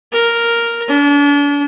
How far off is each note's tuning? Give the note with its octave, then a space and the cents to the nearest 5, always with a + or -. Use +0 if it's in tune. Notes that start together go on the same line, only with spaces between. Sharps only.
A#4 +0
D4 -40